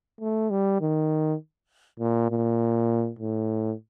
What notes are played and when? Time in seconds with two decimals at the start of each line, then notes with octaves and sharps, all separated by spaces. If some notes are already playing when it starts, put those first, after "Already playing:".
0.21 A3
0.50 G3
0.81 D#3
2.00 A#2
2.30 A#2
3.19 A2